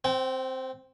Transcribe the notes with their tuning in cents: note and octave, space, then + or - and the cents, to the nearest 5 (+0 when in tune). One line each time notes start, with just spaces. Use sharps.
C4 +0 G5 -35